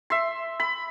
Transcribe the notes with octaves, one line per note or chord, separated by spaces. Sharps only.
E5 C6
B5